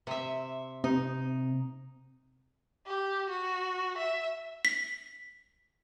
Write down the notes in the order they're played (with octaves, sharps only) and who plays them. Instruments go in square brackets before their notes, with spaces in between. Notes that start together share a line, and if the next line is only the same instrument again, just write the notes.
[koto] C3 E5
[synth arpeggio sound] C3 [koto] D#4
[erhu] G4
F#4
E5
[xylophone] B6